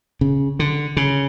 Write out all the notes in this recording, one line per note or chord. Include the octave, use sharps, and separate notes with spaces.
C#3
D3
C#3